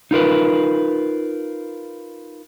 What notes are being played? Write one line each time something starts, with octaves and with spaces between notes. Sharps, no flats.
D#4 F4 A#4 B4